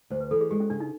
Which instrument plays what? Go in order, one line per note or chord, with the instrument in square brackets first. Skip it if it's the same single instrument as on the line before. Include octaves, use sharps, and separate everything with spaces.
[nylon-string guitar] D2 [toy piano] C5
[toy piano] B4
[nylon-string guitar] E3 [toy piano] A4
[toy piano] G#4
[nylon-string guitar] G#3 [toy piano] G4
[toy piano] C#4
[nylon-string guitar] C#3 [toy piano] D4
[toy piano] D#4